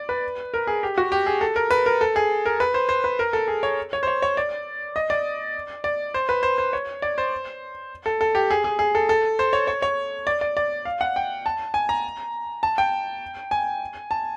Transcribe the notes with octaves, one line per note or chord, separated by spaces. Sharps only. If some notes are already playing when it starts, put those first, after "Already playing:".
Already playing: D5
B4
A#4
G#4
G4
F#4
G4
G#4
A4
A#4
B4
A#4
A4
G#4
A#4
B4
C5
C5
B4
A#4
A4
G#4
C#5
C#5
C5
C#5
C#5
D5
D#5
D5
D5
C5
B4
C5
C5
C#5
D5
C5
A4
A4
G4
G#4
G#4
G#4
A4
A4
C5
C#5
C#5
C#5
D5
D5
D5
F5
F#5
G5
A5
G#5
A#5
A5
G5
G#5
A5